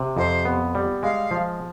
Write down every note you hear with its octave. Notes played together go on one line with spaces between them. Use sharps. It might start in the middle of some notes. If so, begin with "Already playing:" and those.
Already playing: C3
F2 C5
B3
G3
G#3 F5
F3